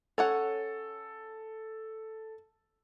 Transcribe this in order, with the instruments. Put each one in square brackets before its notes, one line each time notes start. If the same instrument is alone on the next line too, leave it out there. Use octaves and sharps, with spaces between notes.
[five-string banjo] C#4 C#5 F#5 [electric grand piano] A4